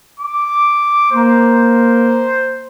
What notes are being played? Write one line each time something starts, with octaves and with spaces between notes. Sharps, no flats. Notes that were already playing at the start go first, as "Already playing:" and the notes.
D6
A#3 C5